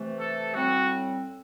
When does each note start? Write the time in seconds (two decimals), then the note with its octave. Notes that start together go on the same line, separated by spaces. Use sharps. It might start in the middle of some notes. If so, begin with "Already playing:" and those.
Already playing: C3 E3 A3
0.19 A4
0.54 A2 G3 C4 F#4